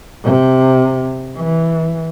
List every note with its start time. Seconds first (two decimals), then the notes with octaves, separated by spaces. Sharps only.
0.24 C3
1.36 E3